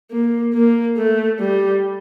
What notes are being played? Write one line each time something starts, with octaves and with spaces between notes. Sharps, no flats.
A#3
A#3
A3
G3